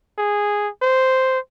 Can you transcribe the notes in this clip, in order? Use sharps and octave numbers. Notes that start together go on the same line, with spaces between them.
G#4
C5